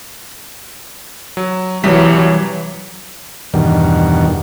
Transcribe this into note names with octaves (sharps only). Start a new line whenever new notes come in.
F#3
C2 E3 F#3 G3 B6
E2 G2 B2 D#3